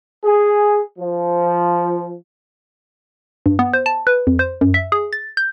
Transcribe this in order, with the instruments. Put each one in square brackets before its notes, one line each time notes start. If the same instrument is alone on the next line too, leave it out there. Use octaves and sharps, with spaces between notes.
[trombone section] G#4
F3
[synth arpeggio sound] G2
B3
C5
A5
B4
F2
C5
F#2
E5
G#4
A6
G6